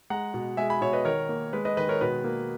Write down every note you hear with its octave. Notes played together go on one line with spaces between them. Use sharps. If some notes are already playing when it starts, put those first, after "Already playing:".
G#3 F#5 A#5
B2
G#3 E5 G#5
G#5 B5
B2 C#5 E5
B4 D#5
D#3 A#4 C#5
A#3
G#3 B4
B4 D#5
D#3 B4 D#5
A#4 C#5
B2 B4
A#3